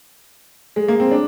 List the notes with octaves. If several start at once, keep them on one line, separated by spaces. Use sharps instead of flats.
G#3
A#3
C4
D4